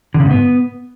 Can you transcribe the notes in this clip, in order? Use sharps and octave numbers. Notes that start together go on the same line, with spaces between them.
D3
C#3
G#2
B3